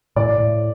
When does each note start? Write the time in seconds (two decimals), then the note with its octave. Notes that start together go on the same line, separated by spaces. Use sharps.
0.16 A2 D5
0.38 A2